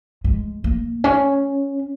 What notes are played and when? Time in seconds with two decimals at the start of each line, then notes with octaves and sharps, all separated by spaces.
0.24 G#3
0.64 A#3
1.04 C#4